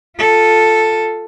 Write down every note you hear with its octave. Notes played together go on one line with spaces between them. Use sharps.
F4 A4